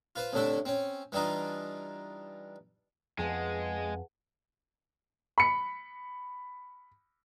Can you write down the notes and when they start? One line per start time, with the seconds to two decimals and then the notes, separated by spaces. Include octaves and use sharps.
0.16 F4 B4 C5
0.33 C2 A2 D3 A3 D4 E5
0.65 C4 C#4
1.12 E3 G3 D4 D#4 F4
3.19 F2 G#3 B3 G#4 F5 F#5 G#5 A5
5.38 B5 C#7